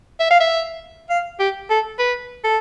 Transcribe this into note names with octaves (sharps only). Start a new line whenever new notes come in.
E5
F5
E5
F5
G4
A4
B4
A4